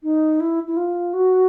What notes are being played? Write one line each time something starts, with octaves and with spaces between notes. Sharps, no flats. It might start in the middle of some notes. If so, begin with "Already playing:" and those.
D#4
E4
E4
F4
F#4